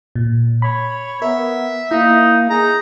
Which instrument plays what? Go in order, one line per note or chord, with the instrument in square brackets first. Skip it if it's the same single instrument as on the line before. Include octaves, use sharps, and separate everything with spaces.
[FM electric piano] A#2
[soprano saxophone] C#5 [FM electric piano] B5
[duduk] B3 [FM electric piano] A#4 [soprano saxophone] E5
[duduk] A#3 [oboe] D#4 [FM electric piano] E4
[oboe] D#4 [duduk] G#4 [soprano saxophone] A#5